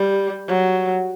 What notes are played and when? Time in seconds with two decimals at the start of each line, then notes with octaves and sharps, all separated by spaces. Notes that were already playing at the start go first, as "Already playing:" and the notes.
Already playing: G3
0.48 F#3